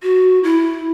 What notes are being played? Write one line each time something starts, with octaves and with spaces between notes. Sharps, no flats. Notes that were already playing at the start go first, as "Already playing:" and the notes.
F#4
E4